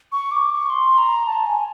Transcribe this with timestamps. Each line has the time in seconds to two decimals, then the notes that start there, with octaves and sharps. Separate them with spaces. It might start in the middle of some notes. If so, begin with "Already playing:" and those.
0.12 C#6
0.31 D6
0.50 C#6
0.70 C6
0.98 A#5
1.27 A5
1.46 G#5